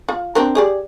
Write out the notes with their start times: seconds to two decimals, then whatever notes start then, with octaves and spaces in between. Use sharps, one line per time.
0.09 F4
0.35 C4 D4 A#4
0.55 G4 G#4 D5